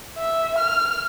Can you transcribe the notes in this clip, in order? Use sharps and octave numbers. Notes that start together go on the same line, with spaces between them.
E5
F6